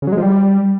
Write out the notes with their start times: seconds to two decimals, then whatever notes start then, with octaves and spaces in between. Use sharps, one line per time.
0.02 C#3
0.07 F#3
0.12 G#3
0.17 F3
0.22 G3